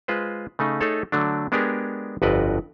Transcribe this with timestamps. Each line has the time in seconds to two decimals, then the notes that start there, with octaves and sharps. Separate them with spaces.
0.08 G#3 F4 B4 C5
0.59 C#3 A3 D#4
0.81 A3 D#4 G#4 A4 C#5
1.12 D3 F#3 A3 D4
1.52 G#3 B3 D4 G4 G#4 A#4
2.22 G1 F2 F#4 B4 D5 D#5